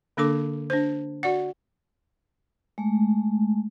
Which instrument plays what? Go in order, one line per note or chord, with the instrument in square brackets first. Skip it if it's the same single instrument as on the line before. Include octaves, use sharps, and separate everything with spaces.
[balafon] D3 A#3 D4 A4 D6
D4 C5
F#4 D5 F#5
[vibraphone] G#3 A3